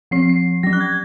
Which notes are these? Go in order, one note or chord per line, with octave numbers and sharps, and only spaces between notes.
F3 C4 C7
C7
F#3 C#4 A#6
F#6
G#6